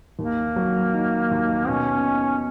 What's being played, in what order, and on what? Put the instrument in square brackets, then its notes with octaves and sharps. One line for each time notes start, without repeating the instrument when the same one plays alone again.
[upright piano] D#2 [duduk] A#3
[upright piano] F#3
D#3
D#2
[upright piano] B2 [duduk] C#4
[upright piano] D#4